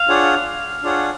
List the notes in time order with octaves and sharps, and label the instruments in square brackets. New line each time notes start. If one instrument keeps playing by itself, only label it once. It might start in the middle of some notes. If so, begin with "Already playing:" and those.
Already playing: [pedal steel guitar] F5
[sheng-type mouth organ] D4 F4 G#4 C#5 F#5
D4 F4 G#4 C#5 F#5